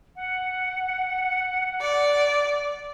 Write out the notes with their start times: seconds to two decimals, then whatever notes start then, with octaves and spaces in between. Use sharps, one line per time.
0.15 F#5
1.81 D5